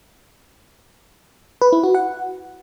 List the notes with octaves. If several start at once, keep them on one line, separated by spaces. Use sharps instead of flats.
B4
E4
F#4
F#5